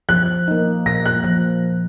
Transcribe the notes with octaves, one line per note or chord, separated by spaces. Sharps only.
F3 F#6
A#3 D#4
A#2 A#6
F#6
F3 F#6